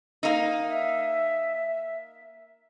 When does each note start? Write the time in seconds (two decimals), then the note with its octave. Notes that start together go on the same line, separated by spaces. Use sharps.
0.23 A#3 D#4
0.68 E5